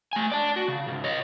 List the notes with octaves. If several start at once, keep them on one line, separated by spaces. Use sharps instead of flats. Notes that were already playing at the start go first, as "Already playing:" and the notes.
A3 G#5
D5 A5
F#4
C#3
C#2 G#2
C#5 D#5